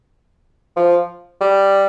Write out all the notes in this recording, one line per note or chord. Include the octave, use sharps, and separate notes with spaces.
F3
G3